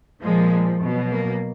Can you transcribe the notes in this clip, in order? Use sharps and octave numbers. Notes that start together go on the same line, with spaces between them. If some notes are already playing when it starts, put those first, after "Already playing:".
A#2 F3 G#3
B2 F#3
A#3